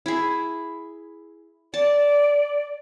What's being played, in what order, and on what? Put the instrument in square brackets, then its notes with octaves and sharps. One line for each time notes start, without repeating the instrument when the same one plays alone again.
[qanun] E4 G#4
[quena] D5 [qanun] A5